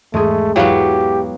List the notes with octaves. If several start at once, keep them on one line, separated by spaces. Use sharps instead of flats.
E2 G#2 G#3 A3 G#4
E2 G#2 F#3 B3 E4 G4 F5